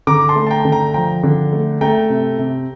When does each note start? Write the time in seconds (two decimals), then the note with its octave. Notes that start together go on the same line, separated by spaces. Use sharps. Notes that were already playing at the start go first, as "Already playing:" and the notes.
0.07 D3 A#5 D6
0.29 A5 C6
0.36 A3
0.47 A5
0.51 G5 A#5
0.65 D3
0.72 G5 A#5
0.94 F3 G5 A#5
1.23 D3
1.53 A3
1.81 A3 G5 A#5
2.10 C3
2.39 C3